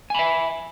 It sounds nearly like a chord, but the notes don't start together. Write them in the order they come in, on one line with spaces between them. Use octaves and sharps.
G#5 B5 E5